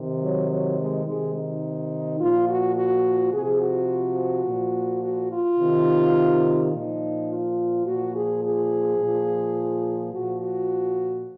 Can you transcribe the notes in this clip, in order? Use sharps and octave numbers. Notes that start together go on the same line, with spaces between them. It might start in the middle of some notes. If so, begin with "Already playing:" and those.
Already playing: C3 D#3
F#3
F#3
G#3
C3 D#3 G#3
D#4
A#2 F3 F4
F#4
F#4
C3 F3 G#4
F#4
A#2 F3
F#4
F4
C3 D#3
A#2 F3 D#4
F4
A#2 F3 F#4
G#4
G#4
A#2 F3
A#2 F3 F#4
F#4